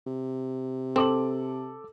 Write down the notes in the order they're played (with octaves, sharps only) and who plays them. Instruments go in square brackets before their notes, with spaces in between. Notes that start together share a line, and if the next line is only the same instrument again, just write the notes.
[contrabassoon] C3
[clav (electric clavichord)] C4 [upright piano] A4 D6 F#7